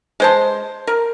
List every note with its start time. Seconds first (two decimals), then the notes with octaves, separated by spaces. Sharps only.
0.20 G#3 C5 A5
0.87 A#4